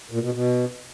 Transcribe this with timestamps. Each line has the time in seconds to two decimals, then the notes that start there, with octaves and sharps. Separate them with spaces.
0.11 A#2
0.22 B2
0.33 B2